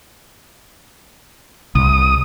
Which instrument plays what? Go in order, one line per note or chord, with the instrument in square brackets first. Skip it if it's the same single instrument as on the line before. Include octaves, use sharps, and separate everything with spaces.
[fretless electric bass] C2 [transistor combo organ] D#6